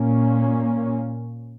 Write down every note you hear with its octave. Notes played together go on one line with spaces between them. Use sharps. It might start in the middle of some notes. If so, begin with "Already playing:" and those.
Already playing: A#2 A#3 C#4